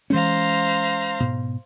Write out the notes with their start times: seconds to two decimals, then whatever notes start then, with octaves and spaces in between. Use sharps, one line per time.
0.10 E3 G#3 C#4 C5 F5 A#5
1.20 G#2 B2